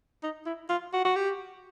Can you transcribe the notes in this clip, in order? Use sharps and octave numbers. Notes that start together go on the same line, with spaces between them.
D#4
E4
F4
F#4
F#4
G4